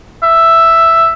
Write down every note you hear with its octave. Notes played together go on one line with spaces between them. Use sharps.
E5